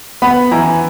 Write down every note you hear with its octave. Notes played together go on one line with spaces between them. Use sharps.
B3 B5
E3 A#5